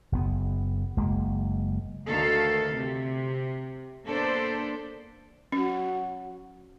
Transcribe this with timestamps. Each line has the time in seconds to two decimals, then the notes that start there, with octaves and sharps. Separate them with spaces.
0.12 F#1 B3
0.97 F#1 G#3 A#3
2.08 D2 D#3 A3 A4 F5
2.73 C3
4.08 A#3 B3 D4 A4 C5 D5
5.52 F#3 C#4